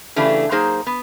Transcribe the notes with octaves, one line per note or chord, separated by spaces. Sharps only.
C#3 E3 A3 D4 G4
F#3 A#3 D#4 G#4 C5
B3